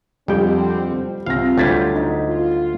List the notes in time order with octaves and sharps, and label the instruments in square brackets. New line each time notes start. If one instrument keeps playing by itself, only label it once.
[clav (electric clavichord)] F2 G5 [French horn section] D3 C4 [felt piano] G3 G4
[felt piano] C2 C4 A#6 [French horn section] F4 [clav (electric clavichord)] F5
[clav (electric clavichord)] D2 F#3 G3 [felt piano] G#6 A6 B6
[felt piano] D#4
[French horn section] F4